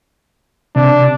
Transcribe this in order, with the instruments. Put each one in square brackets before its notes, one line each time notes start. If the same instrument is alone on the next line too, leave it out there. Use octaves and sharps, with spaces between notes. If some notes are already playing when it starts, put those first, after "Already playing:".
[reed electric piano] C3 [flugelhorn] D4